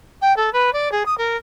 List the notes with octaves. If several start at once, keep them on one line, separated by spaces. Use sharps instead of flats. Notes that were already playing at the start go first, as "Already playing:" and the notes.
G5
A4
B4
D5
G#4
D#6
A#4